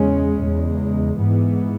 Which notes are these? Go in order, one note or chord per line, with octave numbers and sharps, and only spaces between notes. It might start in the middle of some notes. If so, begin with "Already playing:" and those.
Already playing: E2 C#3 G#3 C#4
E2 C#3 G#3
G#2 E3 B3